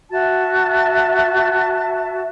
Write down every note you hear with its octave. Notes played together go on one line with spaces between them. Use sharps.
F#4 E5 A5